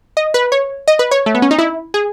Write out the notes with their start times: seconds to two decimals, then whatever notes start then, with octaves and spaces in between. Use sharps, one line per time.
0.17 D#5
0.34 B4
0.52 C#5
0.88 D#5
0.99 B4
1.11 C#5
1.26 A3
1.35 B3
1.42 C#4
1.51 D#4
1.59 E4
1.94 G#4